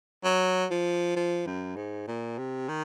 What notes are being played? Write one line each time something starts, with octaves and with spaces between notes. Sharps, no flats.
F#3
F3
F3
F#2
G#2
A#2
C3
D#3